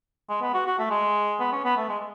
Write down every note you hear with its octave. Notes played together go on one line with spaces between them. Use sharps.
G#3
B3
F#4
F#4
A3
G#3
B3
C#4
B3
A3
G#3